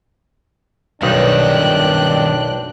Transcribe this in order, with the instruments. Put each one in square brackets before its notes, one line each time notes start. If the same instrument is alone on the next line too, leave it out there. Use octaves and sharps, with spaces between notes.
[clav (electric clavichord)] B1 D#4 [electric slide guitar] G2 D#3 [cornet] D4 [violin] G5 F#6